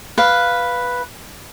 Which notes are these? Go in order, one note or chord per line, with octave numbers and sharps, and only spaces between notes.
B4 F5